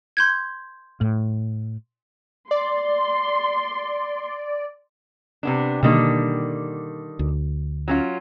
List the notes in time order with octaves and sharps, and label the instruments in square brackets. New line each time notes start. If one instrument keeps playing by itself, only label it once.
[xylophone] C6 G6 G#6
[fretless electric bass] A2
[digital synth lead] D5 [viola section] C6
[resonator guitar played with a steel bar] C3 B3 D4
[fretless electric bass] B2 A#3 [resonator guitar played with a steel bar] D3 D#3 G3
[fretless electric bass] D2
[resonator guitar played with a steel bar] F#3 C#4 F4